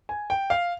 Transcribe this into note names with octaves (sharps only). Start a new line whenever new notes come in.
G#5
G5
F5